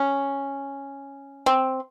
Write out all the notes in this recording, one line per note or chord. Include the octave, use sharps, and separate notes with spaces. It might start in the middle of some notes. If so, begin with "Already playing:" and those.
Already playing: C#4
C4